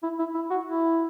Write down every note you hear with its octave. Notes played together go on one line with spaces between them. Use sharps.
E4
E4
E4
F#4
E4